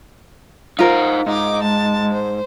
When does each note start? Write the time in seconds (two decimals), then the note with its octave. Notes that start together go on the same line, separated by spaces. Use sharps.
0.79 D#4 F4 A#4 C5
1.26 G#2 D#4 D#5 D6
1.62 G#3 A5
2.12 C5